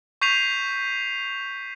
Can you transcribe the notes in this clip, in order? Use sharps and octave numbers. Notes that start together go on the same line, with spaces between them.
C#6 G6 B6 C7 D#7 F7